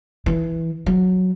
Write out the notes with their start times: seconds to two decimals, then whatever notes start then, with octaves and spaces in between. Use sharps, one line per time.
0.26 E3
0.86 F#3